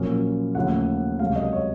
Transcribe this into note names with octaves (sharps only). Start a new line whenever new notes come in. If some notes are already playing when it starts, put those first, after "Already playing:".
Already playing: A#1 A#2 F#3 A#3 C#4
D#2 C#3 F3 A3 F#5
C#2 C3 F#3 F5
D#5
C#5